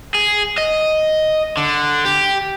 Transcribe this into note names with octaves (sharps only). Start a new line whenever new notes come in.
G#4
D#5
D3
G4